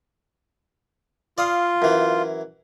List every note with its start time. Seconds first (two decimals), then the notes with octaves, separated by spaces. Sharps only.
1.38 F4 D5 F5 D#6
1.82 F#2 E3